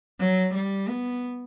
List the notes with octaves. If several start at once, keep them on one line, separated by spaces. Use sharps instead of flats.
F#3
G3
B3